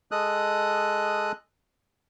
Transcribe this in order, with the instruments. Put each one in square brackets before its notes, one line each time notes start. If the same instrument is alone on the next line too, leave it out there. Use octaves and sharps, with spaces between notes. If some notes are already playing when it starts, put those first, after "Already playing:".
[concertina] G#3 A4 D#5 D#6 F#6